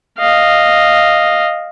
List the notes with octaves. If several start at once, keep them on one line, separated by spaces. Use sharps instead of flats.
D#5 F5